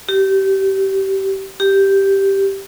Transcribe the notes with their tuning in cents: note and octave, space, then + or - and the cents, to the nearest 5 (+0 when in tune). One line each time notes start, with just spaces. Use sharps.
G4 -25
G4 -5